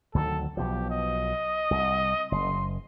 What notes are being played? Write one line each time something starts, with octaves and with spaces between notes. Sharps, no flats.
D2 D#3 F#3 A4
B1 B2 F3 G4
D#5
C2
F#1 C6